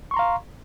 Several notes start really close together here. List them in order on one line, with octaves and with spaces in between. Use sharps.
C#6 C6 A#5 F5